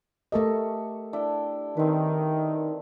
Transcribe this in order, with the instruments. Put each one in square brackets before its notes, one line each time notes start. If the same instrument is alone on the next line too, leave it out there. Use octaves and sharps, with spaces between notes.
[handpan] A3 A#4 D#5 [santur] G4 A4 C#6
[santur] D4 E4 G5
[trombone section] D#3 [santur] C4 B4